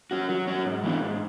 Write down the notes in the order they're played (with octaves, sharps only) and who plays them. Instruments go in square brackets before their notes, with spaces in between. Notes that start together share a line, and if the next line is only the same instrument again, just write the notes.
[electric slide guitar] C#4 F#4
F#3
C#4 F#4
G#2
E3 B3 D4
G#2